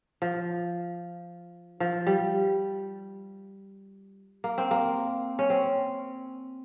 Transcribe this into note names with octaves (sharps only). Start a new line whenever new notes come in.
F3
F3
G3
A#3
C4
A#3
C#4
C4